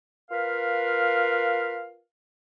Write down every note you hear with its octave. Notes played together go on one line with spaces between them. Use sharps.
F4 A#4 B4 F5